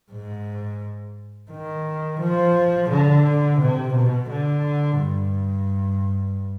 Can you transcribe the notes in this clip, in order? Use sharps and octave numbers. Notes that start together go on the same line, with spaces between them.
G#2
D#3
F3
D3
C3
B2
D3
G2